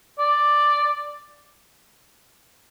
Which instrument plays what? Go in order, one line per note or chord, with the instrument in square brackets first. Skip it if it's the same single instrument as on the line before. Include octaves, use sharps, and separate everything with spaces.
[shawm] D5